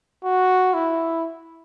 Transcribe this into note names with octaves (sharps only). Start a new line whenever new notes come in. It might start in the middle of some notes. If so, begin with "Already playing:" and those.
F#4
E4